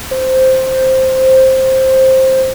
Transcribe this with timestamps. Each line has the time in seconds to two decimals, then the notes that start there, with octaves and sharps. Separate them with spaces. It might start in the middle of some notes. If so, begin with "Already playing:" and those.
0.11 C5